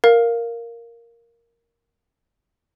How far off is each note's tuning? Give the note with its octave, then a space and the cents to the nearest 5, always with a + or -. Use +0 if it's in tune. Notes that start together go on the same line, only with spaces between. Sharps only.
A#4 +0 F5 +0